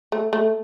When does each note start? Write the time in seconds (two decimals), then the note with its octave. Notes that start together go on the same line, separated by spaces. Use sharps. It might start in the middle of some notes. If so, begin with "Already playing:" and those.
0.12 A3
0.33 A3